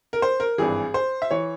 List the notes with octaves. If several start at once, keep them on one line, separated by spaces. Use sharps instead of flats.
A#4
C5
A#4
G#1 G2 E3 G#4
C5
E5
E3 C#5